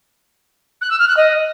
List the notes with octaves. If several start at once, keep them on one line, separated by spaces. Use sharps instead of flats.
F#6
E6
F6
F#6
D#5